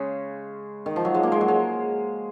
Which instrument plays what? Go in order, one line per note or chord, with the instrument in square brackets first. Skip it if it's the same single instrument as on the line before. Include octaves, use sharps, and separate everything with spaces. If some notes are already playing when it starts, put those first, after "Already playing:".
Already playing: [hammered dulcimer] C#3 G#3
D#3
F3
F#3
G#3
A#3
G#3
F#3
G#3